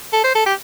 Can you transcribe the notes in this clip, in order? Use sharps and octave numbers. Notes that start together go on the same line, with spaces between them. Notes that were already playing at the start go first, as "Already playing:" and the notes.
A4
C5
A4
G4